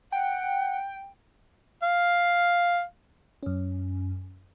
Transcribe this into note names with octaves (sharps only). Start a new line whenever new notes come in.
F#5 G5
F5
F#2 C#4